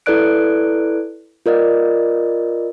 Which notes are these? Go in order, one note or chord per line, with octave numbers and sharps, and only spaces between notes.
E4 A4 B4 D5 F#6 D7
F4 A#4 D5 D#5